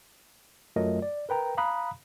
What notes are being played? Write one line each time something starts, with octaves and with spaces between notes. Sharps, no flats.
F#2 F#3 A3 F4 A#4 D#5
D5
A#4 B4 G5 A#5
F5 A#5 B5 D#6 F#6